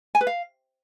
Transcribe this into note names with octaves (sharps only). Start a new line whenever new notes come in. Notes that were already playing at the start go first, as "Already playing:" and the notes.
G#5
B4
F5